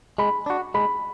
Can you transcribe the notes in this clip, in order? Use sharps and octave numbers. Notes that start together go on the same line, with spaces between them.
G#3 B5
D4 F#4
G#3 B5